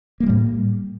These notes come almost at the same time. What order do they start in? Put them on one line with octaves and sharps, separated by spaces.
A#3 G#3 G3 A2